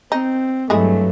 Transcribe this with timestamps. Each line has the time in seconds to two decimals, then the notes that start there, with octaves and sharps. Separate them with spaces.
0.12 C4 D#4
0.70 G2 F#3 G#3 A3 E4 G#4